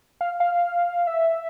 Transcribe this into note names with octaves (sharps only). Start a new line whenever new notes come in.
F5
F5
E5